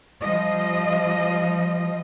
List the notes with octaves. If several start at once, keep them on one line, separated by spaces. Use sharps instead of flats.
F3 G3 D#5